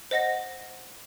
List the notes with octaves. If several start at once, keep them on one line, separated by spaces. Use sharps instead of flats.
C5 D#5 F#5 A#6